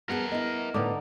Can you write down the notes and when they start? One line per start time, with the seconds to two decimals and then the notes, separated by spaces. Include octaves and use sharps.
0.09 B3 G#4 A#4 F#5 A5
0.32 B3 E4 D#5
0.74 A2 D3 D#4 A#4 B4 D6